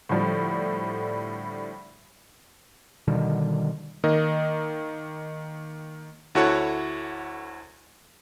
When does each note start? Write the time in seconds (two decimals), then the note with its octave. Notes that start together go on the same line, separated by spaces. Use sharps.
0.09 A2 D3 F3 G3
3.08 B2 D3 D#3 G3
4.04 D#3 A#3 D#5
6.35 D2 E4 F#4 A4 C#5 F#5